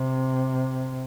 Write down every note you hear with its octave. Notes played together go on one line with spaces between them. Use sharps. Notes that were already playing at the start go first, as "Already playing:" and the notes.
Already playing: C3